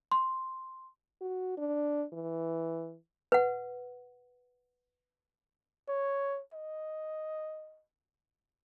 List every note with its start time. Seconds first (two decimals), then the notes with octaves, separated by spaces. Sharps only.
0.12 C6
1.21 F#4
1.57 D4
2.13 E3
3.32 B4 F#5
5.88 C#5
6.53 D#5